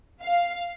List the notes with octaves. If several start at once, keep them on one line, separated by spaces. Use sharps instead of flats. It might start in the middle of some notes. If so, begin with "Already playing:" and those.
F5